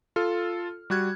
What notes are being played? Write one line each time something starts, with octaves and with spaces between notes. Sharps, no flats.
F4 A4 F6
G3 F#4 F#6 G#6